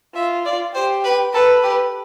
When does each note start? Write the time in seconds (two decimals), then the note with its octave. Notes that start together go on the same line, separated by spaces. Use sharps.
0.15 F4 E5
0.45 D5
0.74 G4 C5
1.04 B4
1.33 A4 B4
1.63 G4